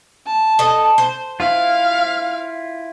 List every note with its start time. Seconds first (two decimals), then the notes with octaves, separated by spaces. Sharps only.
0.26 A5
0.59 A4 D#5
0.98 C5
1.40 E4 F4 F5